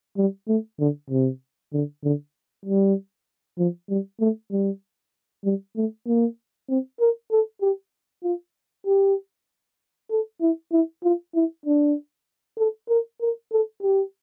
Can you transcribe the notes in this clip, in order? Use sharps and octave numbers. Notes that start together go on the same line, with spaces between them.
G3
A3
D3
C3
D3
D3
G3
F3
G3
A3
G3
G3
A3
A#3
C4
A#4
A4
G4
F4
G4
A4
E4
E4
F4
E4
D4
A4
A#4
A#4
A4
G4